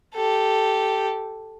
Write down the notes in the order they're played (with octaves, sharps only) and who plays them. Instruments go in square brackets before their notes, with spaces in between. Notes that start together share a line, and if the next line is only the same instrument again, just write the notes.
[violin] G4 A4